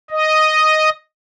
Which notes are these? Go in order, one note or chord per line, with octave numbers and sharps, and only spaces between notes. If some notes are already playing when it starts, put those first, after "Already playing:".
D#5